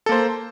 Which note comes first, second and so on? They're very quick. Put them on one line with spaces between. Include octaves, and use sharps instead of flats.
A4 A#3 C5